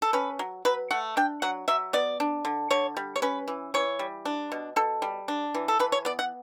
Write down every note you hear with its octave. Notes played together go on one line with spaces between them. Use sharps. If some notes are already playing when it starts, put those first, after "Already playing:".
A4
C#4 B4
F#3
F#3 B4
A3 F#5
D4 G5
F#3 F#5
F#3 E5
B3 D5
D4
D3
D3 C#5
G3
C#5
C#4 B4
E3
E3 C#5
G3
D4
B2
B2 A4
G3
D4
E3
A4
E3 B4
C#5
B3 D5
F#5